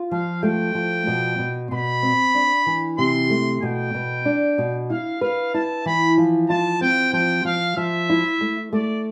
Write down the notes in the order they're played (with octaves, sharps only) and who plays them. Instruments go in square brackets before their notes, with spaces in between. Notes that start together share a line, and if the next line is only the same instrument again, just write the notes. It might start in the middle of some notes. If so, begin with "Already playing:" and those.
Already playing: [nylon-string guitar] F4
[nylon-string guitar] F3 [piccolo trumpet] F5
[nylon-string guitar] A3 [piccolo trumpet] G5
[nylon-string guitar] F3
B2
B2
[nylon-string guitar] B2 [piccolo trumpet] B5
[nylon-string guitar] C4
D4
E3
[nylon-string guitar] C3 [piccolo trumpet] C6
[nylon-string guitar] A3
[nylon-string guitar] B2 [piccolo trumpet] G5
[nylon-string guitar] B2
D4
B2
[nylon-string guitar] E4 [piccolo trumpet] F5
[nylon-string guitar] B4 [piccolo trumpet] F5
[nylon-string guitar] E4 [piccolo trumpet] A5
[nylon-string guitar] E3 [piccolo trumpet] B5
[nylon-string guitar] F3
[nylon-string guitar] F4 [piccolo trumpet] A5
[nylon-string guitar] C4 [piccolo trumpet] G5
[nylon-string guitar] F3 [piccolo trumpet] G5
[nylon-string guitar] F3 [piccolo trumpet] F5
[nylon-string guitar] F3 [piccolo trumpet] E5
[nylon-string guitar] E4
A3
[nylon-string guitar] A3 [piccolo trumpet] D5